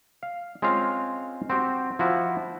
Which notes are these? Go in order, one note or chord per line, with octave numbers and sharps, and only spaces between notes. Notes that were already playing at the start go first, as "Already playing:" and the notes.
F5
G#3 C4 C#4 F4 F5
C4 F#4 G4
F3 E4 F#4 F#5